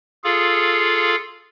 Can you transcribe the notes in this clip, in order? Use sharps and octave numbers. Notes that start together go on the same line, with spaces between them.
F4 G#4 A4 F5